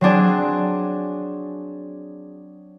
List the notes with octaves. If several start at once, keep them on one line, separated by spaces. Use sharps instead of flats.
F#3 C4 D4 G#4